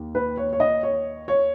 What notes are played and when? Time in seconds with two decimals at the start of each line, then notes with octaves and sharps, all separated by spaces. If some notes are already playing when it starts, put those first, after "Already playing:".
Already playing: D#2
0.15 B4
0.37 C#5
0.53 C#5
0.60 D#5
0.83 C#5
1.28 C#5